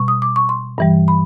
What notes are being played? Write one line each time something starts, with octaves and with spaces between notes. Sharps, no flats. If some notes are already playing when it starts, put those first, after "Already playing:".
Already playing: B2 G3 C#6
D#6
D6
C#6
C6
G2 E3 G3
B5